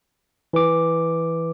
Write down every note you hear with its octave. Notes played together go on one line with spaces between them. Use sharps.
E3 B4 D6